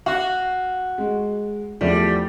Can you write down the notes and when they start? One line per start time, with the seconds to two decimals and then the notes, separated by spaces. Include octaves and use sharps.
0.06 F#4 F5
0.98 G#3
1.81 E2 F3 G3 A3